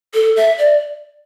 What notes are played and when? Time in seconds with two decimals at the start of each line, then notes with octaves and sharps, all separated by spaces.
0.14 A4
0.36 E5
0.58 D5